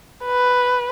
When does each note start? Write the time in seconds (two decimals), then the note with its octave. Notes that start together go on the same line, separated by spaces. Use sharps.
0.25 B4